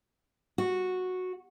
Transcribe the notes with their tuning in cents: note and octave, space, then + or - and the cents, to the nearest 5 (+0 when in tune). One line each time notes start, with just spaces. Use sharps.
F#4 -10